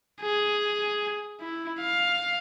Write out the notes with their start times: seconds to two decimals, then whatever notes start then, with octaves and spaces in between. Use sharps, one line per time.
0.21 G#4
1.41 E4
1.80 F5